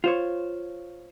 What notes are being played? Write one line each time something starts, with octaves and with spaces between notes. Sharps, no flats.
F4 C5 C#5